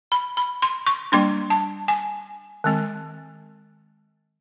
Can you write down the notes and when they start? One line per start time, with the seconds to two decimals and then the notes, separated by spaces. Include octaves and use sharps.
0.12 B5
0.37 B5
0.62 C6
0.87 C#6
1.12 G3 A#3 D4 C6
1.50 A5
1.88 G#5
2.64 D#3 G#3 C4